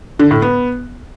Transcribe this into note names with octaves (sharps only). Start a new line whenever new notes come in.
D3
A2
B3